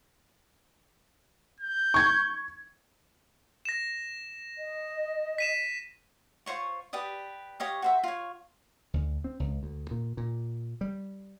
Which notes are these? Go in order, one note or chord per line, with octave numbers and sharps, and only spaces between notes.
G6
C#6 G#6
A#6 E7
D#5
B6 D#7 E7
F4 C5 C#5 C#6
G4 B4 D5 D#6
G4 C#5 D#5 F5
F#4 C5 E5
F4 C#5
D2
C4
C#2
D2
A#2
A#2
G3